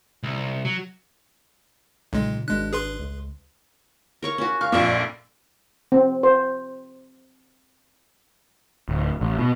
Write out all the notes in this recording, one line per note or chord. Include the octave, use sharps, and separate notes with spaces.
C2
F#3
B1 A#2 C#3 G#3
G#1 G#3 D4 F#6
G#4 B4 C6
C#2
A#4 C#5 C#6
C#4 F#4
F5 C#6 F6
A#1 F2 A#2 E5 C#6
C4
C5
D1
A1
B2